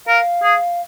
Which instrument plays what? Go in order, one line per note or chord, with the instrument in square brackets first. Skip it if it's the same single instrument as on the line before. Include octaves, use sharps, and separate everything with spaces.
[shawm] A#4 [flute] F5
[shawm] G#4